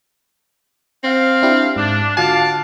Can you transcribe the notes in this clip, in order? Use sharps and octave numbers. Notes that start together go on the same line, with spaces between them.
C4 F5
D4 E4 G4
G#2 D4
D3 F4 F#4 D5 F5 A5